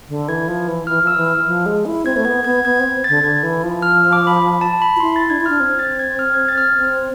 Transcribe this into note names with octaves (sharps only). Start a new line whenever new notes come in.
D3
E3 G#6
F3
E3
E3 F6
F3
E6
E3
F6
F3
G#3
E4
C4 G#6
A3
B3 G#6
B3 G#6
B3 G#6
C4 G#6
A6
D3
D3 G#6
E3
F3
F6
E6
D6
B5
B5
A5
B5
F4
E4 C6
A6
D4 G#6
E4
F6
D4
C4 G#6
A6
G#6
F6
G#6
A6
F6
G#6
C4